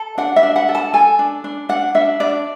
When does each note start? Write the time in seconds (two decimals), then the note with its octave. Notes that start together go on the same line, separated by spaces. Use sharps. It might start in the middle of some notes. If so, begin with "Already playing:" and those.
Already playing: A4
0.18 D4 F#5
0.36 E5
0.43 D4
0.56 F#5
0.68 A4
0.75 A5
0.94 A4 G#5
1.19 D4
1.44 D4
1.69 D4 F#5
1.95 D4 E5
2.20 D4 D5